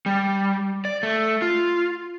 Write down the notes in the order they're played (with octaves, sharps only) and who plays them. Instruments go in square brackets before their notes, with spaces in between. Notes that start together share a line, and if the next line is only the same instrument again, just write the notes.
[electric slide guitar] G3
D5
A3
F4